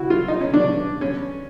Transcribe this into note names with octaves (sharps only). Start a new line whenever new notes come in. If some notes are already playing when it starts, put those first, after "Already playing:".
Already playing: E4 F#4
F4
D#4
C#4
D4
C#4